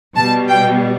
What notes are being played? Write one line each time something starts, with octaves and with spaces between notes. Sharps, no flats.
B2 G3 A5
G5